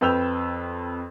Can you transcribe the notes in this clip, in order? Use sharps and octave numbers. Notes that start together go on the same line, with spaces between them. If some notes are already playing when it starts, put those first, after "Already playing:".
F2 B4 G5 E6 G6 F7